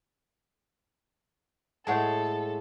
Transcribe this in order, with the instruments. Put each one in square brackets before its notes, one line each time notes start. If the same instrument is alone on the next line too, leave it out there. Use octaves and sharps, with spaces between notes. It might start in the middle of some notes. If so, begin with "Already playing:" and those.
[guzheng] A2 G#3 [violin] A4 [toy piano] C#5 F#5 A5